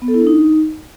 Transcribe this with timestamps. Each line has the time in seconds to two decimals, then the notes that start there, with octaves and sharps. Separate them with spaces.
0.02 B3
0.08 A4
0.14 E4
0.21 D4
0.27 D#4